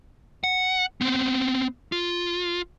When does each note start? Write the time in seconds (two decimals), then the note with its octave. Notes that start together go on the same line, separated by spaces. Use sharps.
0.44 F#5
1.01 B3 C4
1.92 F4